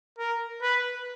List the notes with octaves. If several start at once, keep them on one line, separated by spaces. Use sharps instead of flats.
A#4
B4